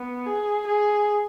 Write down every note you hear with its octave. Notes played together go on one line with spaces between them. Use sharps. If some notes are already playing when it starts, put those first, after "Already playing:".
Already playing: B3
G#4
G#4